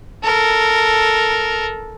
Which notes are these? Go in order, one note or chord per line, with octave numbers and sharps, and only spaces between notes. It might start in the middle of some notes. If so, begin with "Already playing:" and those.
A4 A#4